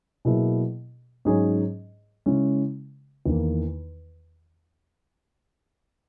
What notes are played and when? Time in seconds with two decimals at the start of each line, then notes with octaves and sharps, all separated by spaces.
0.25 B2 F#3 A#3 E4 G#4
1.25 G#2 F#3 C#4 G#4 C#5
2.26 C#3 G#3 C#4 E4
3.26 E2 D#3 A#3 D#4